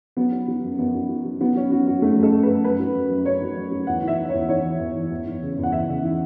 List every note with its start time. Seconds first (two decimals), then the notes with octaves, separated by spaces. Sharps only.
0.17 F#3 B3
0.32 F#3
0.48 F#3
0.63 F#2
0.79 F#2 B3
0.95 F#3
1.09 F#3
1.25 F#3
1.40 F#3 B3
1.56 F#3 C#4
1.72 F#3 F#4
1.88 F#2 F#4
2.02 F#2 A3
2.17 F#2
2.23 A4
2.34 F#2
2.43 B4
2.49 F#2
2.64 F#2 B4
2.80 F#3
2.95 F#2
3.10 F#2
3.25 F#2 C#5
3.42 F#3
3.57 F#2
3.72 F#3
3.87 E2 F#5
4.03 E3 E5
4.18 E3
4.29 E2 C#5
4.49 E3 C#5
4.64 E3
4.80 E2
4.96 E3
5.11 E2
5.26 E3
5.43 C#3
5.58 E2
5.63 F#5
5.72 E2 E5
5.88 C#3
6.04 E3